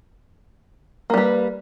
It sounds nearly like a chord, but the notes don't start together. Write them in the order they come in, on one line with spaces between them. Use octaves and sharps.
A#3 G3 B4